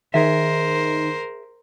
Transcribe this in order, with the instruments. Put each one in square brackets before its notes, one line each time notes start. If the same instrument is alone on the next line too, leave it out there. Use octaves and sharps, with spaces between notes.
[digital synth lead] D#3 [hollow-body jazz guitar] G#4 E5 [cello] A#4 C5